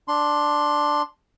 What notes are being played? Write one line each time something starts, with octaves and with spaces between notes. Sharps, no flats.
D4 C6